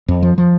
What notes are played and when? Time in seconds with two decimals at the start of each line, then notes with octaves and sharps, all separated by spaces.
0.08 F2
0.23 F3
0.38 F3